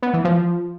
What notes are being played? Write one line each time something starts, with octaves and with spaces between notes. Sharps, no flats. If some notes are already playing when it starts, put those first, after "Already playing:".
B3
E3
F3